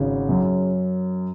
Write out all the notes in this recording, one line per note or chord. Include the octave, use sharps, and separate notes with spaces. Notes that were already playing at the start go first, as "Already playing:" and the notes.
Already playing: G#1 C#3
F#2